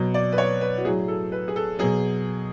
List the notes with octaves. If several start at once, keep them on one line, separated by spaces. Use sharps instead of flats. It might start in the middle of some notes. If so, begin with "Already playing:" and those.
Already playing: B2 F#3
D5
B4
C#5
B4
F#4
A2 F#3 G#4
A4
B4
G#4
A4
B2 F#3 G#4